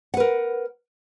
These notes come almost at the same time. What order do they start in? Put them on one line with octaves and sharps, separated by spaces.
F#5 B4 A#4